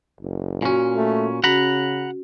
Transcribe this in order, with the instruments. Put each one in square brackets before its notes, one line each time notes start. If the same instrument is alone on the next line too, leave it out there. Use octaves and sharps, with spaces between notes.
[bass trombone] F#1
[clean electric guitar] A#2 C#4 [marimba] F#4 G#5
[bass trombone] A3
[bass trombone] C#3 [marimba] C#4 F#4 [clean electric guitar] F#5 A#5 B5